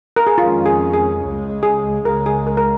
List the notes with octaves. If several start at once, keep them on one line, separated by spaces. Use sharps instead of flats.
A#4
G#4
F2 D#3 G#3 C#4 F4
G#4
G#4
C#2 C#3 G#3
G#4
C#2 C#3 G#3 A#4
G#4
A#4
A#4